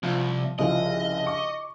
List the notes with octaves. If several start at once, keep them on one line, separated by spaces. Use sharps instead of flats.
C2 F3
C2 C#3 F3 D#5
C#6 D6